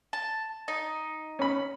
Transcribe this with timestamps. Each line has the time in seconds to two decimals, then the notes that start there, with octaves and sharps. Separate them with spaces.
0.13 A5
0.68 D#4
1.39 C#4 B5